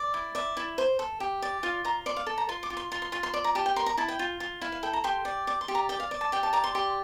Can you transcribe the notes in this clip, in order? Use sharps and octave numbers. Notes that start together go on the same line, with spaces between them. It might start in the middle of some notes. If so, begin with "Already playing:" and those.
Already playing: D5
E4
D5 E5
E4
C5
A4
G4
D5
F4 F5
F4 A#5
D5 C6
F5
A4
A#5
F4 C6
D6
F4
C6
F4 C6
C6
F4 C6
C6
D5 C6
A#5
G4 A5
G5
A#4 C6
A#5
E4 A5
G5
F4
F4
E4 F5
F5
A4 G5
A#5
G4 C6
D5
D5 D6
C6
G4
A#5
D5 G5
F5
D5
A5
G4 G5
A5
D5 A#5
C6
G4 C6